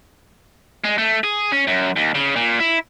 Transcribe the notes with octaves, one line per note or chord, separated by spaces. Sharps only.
G#3
A3
G#4
C#4
F#2
D#2
C#3
A#2
E4